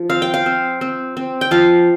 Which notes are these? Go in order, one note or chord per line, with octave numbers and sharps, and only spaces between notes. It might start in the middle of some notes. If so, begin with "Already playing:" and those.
Already playing: F3
C4 F5
G5
F5
C4
C4
C4
G5
F3 F5